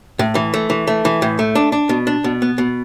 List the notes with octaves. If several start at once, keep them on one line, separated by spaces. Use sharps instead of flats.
A2
E3
A3
E3
A3
E3
A2
A3
D4
D4
B2
D4
B2
B3
B2